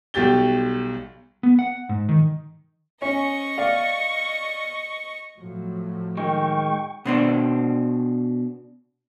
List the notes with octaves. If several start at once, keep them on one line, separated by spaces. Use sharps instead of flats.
B1 G3 F#4 G4 A6 G7
B3
F#5
G#2
D#3
C#4 D#5 C#6
D5 F5
A2 F3 F#3
D#3 G#3 G5 C#6
B2 C4 D4